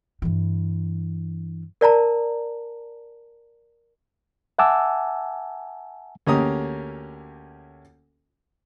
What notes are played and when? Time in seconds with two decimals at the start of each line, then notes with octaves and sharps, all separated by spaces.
0.22 G2 E3
1.81 A#4 D5 A5 A#5
4.59 E5 F#5 G#5 A5 D6 E6
6.27 D2 A#3 C#4 G4 A#5 D#6